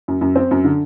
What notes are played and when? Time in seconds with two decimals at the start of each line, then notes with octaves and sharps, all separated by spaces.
0.08 F#2
0.21 F#2
0.36 C4
0.51 F#2
0.64 D3